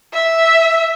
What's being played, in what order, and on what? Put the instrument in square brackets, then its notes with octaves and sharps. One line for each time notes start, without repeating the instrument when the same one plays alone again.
[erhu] E5